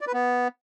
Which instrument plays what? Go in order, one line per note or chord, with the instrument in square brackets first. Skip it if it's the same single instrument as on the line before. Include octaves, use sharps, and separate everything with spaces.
[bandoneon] D5
B4
B3